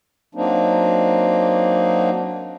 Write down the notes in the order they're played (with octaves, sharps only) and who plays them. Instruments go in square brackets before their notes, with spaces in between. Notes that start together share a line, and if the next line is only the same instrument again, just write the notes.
[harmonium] F#3 A#3 C4 D4 D#4